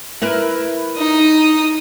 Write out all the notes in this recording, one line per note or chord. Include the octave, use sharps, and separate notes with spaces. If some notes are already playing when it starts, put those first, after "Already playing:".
E4 A#4 B4
D#4 D#6